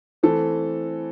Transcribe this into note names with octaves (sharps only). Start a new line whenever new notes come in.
E3 A3 C4 A4